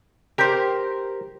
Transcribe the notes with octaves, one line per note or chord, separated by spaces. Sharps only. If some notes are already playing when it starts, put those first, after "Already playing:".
G4 A#4 C5